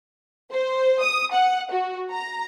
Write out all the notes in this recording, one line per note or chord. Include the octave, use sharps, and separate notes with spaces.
C5
D#6
F#5
F#4
A#5